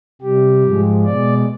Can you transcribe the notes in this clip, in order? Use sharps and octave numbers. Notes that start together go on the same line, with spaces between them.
C3 G3 G4
G#2 F3 G#3
B2 G#3 D5